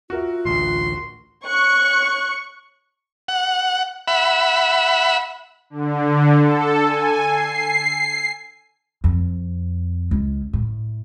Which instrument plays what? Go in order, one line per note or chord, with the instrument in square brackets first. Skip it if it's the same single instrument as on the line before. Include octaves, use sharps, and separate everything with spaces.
[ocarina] F4 [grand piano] F#4 A#4 E5
[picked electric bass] A1 D2 [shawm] C6
[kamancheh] C#5 F#6 [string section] C#6
[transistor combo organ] F#5
E5 F#5 B5
[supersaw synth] D3
A4
G#5
C7
[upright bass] F2
C#2
A2